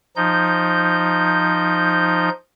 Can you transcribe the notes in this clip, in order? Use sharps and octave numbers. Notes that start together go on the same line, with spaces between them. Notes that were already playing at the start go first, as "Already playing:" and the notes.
F3 D#4 G6